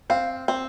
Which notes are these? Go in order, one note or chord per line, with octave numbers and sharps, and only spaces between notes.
C4 F5
C4